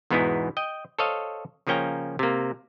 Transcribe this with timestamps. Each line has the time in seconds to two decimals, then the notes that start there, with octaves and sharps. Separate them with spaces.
0.10 E2 G#2 B2 B3 D#4 E4
0.57 D#5 G5
0.99 A4 C5 C#5 D#5 F5
1.67 C#3 F3 A#3 C#4 G5 A#5
2.19 C3 A#3